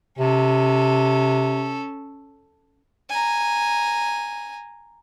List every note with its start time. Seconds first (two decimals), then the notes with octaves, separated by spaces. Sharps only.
0.19 C3 C#4 A4
3.10 G#5 A#5